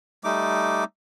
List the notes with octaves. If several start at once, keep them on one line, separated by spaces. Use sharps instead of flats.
G3 A3 D#4 D6